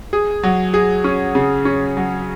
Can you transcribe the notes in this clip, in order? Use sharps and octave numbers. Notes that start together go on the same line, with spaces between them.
G#4
F#3
G#4
C#4
C#3
C#4
F#3